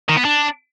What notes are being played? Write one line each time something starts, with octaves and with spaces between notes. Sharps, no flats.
D#3
B3
D4